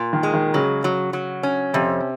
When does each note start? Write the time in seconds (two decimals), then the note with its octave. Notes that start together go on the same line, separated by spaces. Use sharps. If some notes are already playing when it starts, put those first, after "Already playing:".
Already playing: A#2
0.13 D#3
0.23 G#3
0.33 D#3
0.54 C#3 F#3
0.84 F#3
1.13 F#3
1.43 C#4
1.74 F2 C3